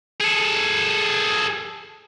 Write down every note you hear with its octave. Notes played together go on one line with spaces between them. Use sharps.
G#4 A4